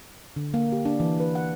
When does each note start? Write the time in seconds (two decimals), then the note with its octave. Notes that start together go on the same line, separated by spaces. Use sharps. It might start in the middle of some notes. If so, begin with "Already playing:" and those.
0.36 D3
0.54 A#3
0.72 G4
0.85 D4
1.00 E3
1.20 B4
1.35 F#5